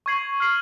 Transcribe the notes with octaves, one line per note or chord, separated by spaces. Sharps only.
C#6 G#6 C7 F#7
F6 C7 F#7